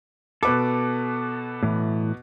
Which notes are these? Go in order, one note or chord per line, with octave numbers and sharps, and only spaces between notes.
B2 A4 B4 D6
A2 E3